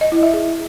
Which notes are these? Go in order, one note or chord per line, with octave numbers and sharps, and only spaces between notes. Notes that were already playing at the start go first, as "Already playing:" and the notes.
D#5
E4
E5
G#4